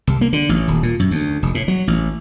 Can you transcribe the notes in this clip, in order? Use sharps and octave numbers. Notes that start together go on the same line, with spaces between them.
C2
A#3
D3
A1
D#1
A#2
F#2
D2
F1
A2
F#3
A1